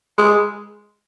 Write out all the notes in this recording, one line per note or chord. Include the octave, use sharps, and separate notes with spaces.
G#3